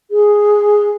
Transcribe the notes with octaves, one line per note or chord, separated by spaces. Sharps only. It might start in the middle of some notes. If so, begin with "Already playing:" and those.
G#4